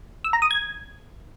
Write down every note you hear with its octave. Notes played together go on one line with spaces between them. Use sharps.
E6
A#5
D#6
G#6